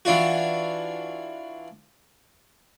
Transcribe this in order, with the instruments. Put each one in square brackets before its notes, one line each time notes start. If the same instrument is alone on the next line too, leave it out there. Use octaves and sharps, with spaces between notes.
[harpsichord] E3 D4 F4 F#4